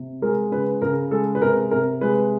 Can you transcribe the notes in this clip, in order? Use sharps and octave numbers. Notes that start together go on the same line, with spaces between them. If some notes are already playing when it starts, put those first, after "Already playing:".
Already playing: C3
G#3 A#4
C#3 B4
C#3 A#4
G#3 A4
B4
C3 A#4
C3 A#4
G#3 B4